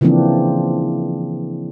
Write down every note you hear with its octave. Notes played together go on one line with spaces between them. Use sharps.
C#3 E3 F3 A#3 C4 D4